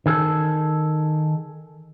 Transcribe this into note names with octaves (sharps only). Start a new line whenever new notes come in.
D#3 G#4 A4